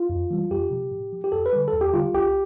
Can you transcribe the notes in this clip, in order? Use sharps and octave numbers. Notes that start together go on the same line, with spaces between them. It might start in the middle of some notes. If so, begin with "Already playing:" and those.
Already playing: F4
F2
E3 G3
F2 G4
C3 F3
A2
F3
G4
F2 A4
B4
D3 G3
A4
E2
G4
D3 G3 F4
C2 G4